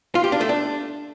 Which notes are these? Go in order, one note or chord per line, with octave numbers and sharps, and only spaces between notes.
F4
G4
D4
A3
D4